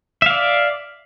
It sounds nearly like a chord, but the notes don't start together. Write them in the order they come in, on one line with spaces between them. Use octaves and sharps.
E5 F5 D5